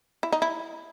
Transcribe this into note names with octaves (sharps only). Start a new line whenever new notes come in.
E4
D#4
E4